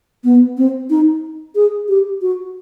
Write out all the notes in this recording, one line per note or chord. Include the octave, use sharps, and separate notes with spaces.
B3
C4
D#4
G#4
G4
F#4